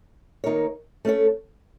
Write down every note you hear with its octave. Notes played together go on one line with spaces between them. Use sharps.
D#3 A#3 D#4 A#4 C#5
A3 C#4 A4 C#5